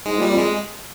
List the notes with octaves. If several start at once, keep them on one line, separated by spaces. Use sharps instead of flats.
G#2 G#3
A#2 G3
F2
G#3